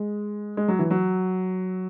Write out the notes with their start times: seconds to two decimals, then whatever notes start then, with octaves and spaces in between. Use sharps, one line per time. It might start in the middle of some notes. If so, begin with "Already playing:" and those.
Already playing: G#3
0.57 G#3
0.68 F#3
0.79 E3
0.90 F#3